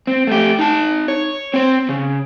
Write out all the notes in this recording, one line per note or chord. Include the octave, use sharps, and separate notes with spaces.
C4
A3 G4
D#4 A5
C#5
C4 C5
C#3